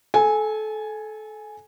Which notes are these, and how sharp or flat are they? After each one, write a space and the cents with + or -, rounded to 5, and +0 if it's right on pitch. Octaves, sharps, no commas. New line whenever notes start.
A4 -25 G#5 +0